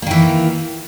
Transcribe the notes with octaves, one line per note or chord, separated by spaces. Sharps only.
D#3 E3 A#3